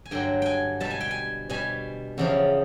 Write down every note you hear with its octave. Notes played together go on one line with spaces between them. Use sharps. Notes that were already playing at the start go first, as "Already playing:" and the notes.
G#5
G2 D3 F#3 G5
G5 G#5
B2 G3 A5
G#5
G5
G#5
B2 G3 G#5
E2 C#3 F3